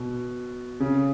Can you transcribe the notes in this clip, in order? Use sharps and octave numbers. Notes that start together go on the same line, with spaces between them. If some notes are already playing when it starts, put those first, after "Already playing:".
Already playing: B2
C#3